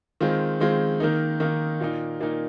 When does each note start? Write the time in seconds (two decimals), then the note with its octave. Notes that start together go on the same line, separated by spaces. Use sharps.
0.21 D#3 G#3 C4 F4
0.60 D#3 G#3 C4 F4
1.00 D#3 A#3 D#4
1.40 D#3 A#3 D#4
1.80 A#2 A#3 D#4
2.20 A#2 A#3 D#4